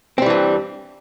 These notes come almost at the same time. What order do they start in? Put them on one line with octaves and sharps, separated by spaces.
C4 G3 E3 G2